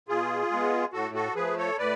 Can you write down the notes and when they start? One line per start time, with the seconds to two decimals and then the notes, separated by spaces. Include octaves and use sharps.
0.08 B2 F4 G#4
0.51 G#3 B3
0.93 A2 F#4 A4
1.14 F#4 A4
1.35 F3 A3 G#4 B4
1.57 A4 C#5
1.78 A2 B4 D5